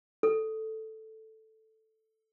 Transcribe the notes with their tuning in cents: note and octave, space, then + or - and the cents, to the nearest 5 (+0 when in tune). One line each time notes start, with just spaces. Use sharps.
A4 +0